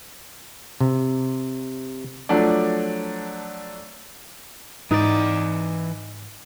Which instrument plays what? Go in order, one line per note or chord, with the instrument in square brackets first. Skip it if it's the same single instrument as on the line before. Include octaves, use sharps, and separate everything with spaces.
[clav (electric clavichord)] C3
[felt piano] F3 F#3 A3 D4 D5
[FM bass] G#2 [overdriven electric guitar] E3 D5 [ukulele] D#4